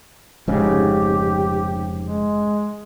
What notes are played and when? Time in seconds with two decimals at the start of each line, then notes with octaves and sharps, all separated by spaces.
0.48 F1 G#2 C#3 G4
2.01 G#3